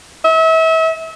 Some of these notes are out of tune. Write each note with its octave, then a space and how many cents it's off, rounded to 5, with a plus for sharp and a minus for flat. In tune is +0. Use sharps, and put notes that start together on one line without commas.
E5 -35